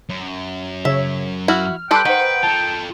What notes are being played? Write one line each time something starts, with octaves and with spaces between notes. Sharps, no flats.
F#2
C#3 C#5 E5
E4 F#4 F6
G3 A4 B4 G5 C6 D6 F#6
D#3 B4 C5 F#5
F4 A4 A5